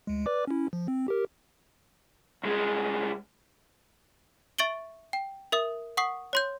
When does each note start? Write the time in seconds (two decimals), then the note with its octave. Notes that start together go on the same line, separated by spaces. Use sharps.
0.07 D2 G#3
0.26 B4 D5 D6
0.47 C#4 E4
0.73 F3
0.88 C4
1.08 G4 A#4
2.43 C2 G#3
4.58 E5 C#6 A6 D7 F#7 G7
5.13 G5
5.52 A#4 E5 D#6
5.97 F#5 C#6 D#6 C7
6.33 C#5 C6 G6